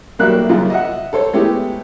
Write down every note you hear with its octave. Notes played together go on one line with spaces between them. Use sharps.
B1 G3 A#3 F#4 E5 F#6
F#2 C#3 F4
D#5 E5 F#5
A4 C5 C#5
G#3 A3 B3 E4 G4